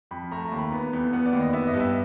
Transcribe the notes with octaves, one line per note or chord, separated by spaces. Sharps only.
F2 B5
A3 A#5
A#5
D#2
B5
B3
E2
B3 F#5
D5
D#2
D#5
B3 E5
D#5
G2
E5